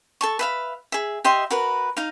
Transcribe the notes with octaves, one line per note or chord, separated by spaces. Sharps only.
A4 A5 C#6
B4 E5 F5
G#4 E5
G4 D#5 E5 C6
F#4 A#4 B4
D#4 F5